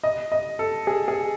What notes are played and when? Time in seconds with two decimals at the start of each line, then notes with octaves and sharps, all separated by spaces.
0.03 D#5
0.32 D#5
0.59 A4
0.87 G#4
1.08 G#4